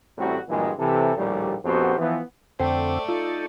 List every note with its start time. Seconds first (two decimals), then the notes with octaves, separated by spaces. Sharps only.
0.18 A1 A2 G3 C4 F#4
0.49 G2 A#2 E3 F#3 G#3
0.79 C3 E3 A4
1.17 A#1 D#2 A2 G3
1.65 A#1 F2 B3 F#4 G4 C5
1.98 E3 F3 B3
2.60 F2 D3 A3 C4 C5 D5 G5
3.09 D#4 F4 A4